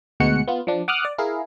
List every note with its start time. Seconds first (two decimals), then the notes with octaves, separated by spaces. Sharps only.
0.20 D2 B2 G#3 F#4 F#5 C#7
0.48 B3 F4
0.67 F3 D4
0.88 F#5 D6 D#6 F6 F#6
1.05 D5
1.18 E4 G#4 A#4 F5